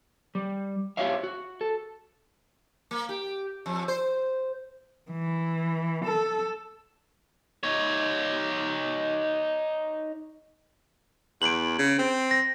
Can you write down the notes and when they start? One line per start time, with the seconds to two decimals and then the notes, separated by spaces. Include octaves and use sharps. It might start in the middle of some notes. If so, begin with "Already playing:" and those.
0.35 G3
0.97 F#4 G4 C#5 E5 F5
1.23 F#4
1.61 A4
2.91 A#3
3.09 G4
3.66 F2
3.88 C5
5.11 E3
6.05 A4
7.63 D#4 C#5
11.42 E2 D7 F#7
11.79 C#3
11.99 C4
12.31 A#6